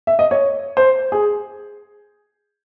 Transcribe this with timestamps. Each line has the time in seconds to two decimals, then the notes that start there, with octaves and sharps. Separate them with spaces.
0.07 E5
0.19 D#5
0.31 C#5
0.77 C5
1.12 G#4